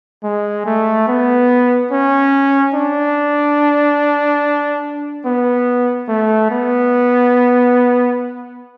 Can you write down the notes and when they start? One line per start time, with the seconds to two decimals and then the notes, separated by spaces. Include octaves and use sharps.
0.24 G#3
0.66 A3
1.08 B3
1.91 C#4
2.74 D4
5.25 B3
6.08 A3
6.51 B3